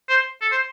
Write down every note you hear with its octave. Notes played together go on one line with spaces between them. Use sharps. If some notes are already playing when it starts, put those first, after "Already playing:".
C5
A4
C5